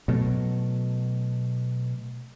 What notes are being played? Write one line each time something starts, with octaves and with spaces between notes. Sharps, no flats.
B2 F#3 A3